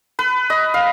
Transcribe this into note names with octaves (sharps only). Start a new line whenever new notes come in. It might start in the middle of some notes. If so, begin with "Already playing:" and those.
B4
D#5
F5